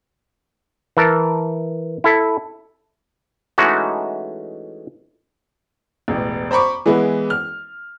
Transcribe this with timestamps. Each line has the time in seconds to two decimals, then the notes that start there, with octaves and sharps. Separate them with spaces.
0.97 E3 A#4 A5
2.04 E4 A4
3.58 E3 G#3 A3 C#4 D#4 F#4
6.08 E1 A1
6.51 C5 A#5 B5 C#6 D6
6.86 E3 G#3 B3 E4
7.30 F6